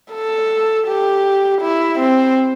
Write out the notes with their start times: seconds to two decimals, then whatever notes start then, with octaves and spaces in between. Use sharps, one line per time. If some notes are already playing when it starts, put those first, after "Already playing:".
0.12 A4
0.87 G4
1.62 E4
1.99 C4